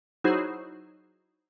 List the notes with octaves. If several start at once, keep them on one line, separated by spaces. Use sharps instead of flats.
F#3 D#4 E4 F#4 G#4 C5